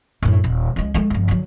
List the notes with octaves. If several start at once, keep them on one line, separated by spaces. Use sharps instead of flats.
F#2 A2
D#1
C#2 G#3
G#3 A3
G1 F2
D3 F#3